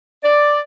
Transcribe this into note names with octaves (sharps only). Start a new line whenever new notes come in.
D5